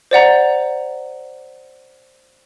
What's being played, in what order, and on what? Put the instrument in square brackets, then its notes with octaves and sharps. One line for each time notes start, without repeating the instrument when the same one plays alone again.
[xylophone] C5 D5 F#5 A#5